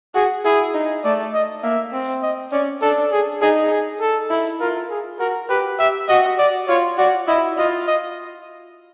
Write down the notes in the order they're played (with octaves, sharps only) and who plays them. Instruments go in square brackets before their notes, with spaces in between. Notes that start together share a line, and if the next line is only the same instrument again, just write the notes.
[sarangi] F#4 [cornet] G#4
[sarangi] E4 [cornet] G#4
[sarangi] D#4
[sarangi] A3 [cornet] D5
[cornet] D#5
[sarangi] A#3 [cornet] E5
[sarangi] C4
[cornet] D#5
[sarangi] C#4 [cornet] D5
[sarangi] D4 [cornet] A4
[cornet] G#4
[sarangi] D#4 [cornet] G#4
[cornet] G#4
A4
[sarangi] E4
[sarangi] F4 [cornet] A#4
[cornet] G#4
[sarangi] F#4 [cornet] A#4
[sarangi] G4 [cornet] B4
[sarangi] G4 [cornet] E5
[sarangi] F#4 [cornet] D#5
[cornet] D5
[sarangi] F4 [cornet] C#5
[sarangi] F#4 [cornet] D5
[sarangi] E4 [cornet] D#5
[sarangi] F4 [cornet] D#5
[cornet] D#5